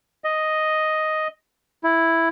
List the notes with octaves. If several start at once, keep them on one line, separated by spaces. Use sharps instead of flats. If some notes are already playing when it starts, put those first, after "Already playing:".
D#5
E4